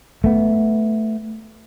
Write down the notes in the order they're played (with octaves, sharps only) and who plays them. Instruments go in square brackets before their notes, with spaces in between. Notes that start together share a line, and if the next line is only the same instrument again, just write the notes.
[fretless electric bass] A3 B3